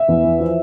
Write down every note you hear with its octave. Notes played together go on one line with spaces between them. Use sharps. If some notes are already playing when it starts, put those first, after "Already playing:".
Already playing: E5
E2
E3
F3